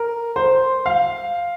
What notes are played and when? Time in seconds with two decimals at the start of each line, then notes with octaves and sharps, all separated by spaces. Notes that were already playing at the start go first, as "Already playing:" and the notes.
Already playing: A#4
0.36 C5
0.86 F5